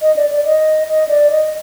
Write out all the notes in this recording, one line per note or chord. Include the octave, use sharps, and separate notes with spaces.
D#5
D5
D5
D#5
D#5
D5
D#5